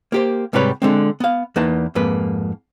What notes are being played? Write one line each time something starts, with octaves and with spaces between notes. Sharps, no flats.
A#3 G4 C5
G#2 C3 G3 G4 B4 C#5
D3 G#3 C4
B3 F5
E2 A#3 D#4 B4 D#5 A5
F2 G#2 A#3 B4